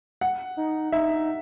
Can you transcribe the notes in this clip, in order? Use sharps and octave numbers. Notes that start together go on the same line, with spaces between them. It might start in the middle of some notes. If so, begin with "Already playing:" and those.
F#5
D#4
D#4 E5